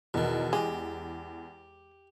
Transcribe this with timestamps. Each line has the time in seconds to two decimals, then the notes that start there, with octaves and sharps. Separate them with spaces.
0.14 E2 B2 D#3
0.53 G#3 G4